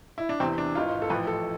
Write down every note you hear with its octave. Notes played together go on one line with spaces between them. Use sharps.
E4
D4
E2 C3 E3 C4
D4
G#1 G#2 E3 F4
A4
A1 A2 F3 B4
A4